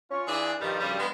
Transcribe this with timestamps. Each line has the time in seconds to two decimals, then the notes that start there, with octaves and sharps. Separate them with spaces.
0.11 C#4 F4 C#6
0.28 E3 D4 F4 G#4
0.61 G2 D#3 F3 G3
0.80 F#2 C#3 G3
0.99 G#3 B3